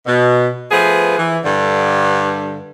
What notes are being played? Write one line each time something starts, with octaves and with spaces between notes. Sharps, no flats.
B2
F3 A3 B3 G#4 B4
E3
G2 D3